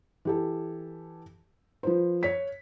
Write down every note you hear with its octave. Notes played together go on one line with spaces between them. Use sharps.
E3 G4 A4
F3 B4 C5
C#5 B6